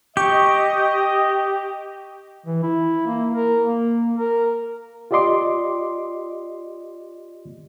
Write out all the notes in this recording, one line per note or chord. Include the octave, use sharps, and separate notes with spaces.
G4 D#5 C#6
E3
E4
A#3
A#4
A#3
A#4
F4 G4 D5 D#5 C6 D6